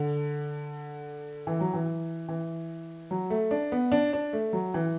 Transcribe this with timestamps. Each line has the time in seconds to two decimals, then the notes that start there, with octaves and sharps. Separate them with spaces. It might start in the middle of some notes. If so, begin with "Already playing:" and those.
Already playing: D3
1.47 E3
1.60 F#3
1.74 E3
2.28 E3
3.11 F#3
3.30 A3
3.51 D4
3.72 B3
3.92 D4
4.13 D4
4.33 A3
4.53 F#3
4.74 E3